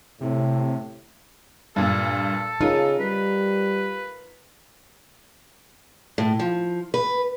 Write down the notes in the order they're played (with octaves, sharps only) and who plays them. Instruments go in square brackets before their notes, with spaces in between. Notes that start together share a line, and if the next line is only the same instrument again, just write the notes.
[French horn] A2 [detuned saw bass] C3
[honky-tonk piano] G2 A#2 [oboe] A4
[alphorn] C#3 [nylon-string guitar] D#4 [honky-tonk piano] F4 A#4
[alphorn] G3 [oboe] B4
[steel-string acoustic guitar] A2
F3
B4